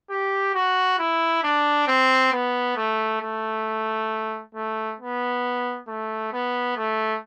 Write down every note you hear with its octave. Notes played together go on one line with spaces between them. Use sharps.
G4
F#4
E4
D4
C4
B3
A3
A3
A3
B3
A3
B3
A3